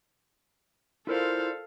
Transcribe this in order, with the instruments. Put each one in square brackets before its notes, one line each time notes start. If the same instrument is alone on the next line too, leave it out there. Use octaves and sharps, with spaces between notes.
[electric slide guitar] E4 D5 [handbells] F4 A#4 C5 [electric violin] A4 F5